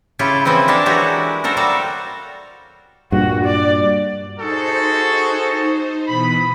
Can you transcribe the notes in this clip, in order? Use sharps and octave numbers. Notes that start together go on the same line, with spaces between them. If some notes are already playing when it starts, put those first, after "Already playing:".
C#3 E4 F4 G4 A4
E3 F3 G#3 C4 E4
D4 G4 A4 A#4 C#5 D5
E3 F#3 G#3 E4 F#4 G4
F#4 A4 A#4 C5
G3 F#4 A4 A#4 D5 F5
G2 A#2 F#4
D5
D#4 F#4 G#4 A4 C5
B2 E3 B5 D#6